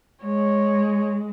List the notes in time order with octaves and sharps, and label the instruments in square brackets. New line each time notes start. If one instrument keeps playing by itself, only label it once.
[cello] G#3 [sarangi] C#5